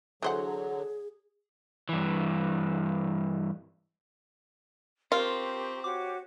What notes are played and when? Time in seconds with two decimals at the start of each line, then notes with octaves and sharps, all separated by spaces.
0.22 D3 E3 F#3 G#4 C5 F#5
1.89 G2 E3
5.12 C4 F4 G4 A#4 A#5 C#6
5.84 F#4 G4 C#5 D6